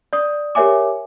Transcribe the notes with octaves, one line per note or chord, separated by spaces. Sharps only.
D5 D#6
G4 A#4 C#5 E5 G#5 D6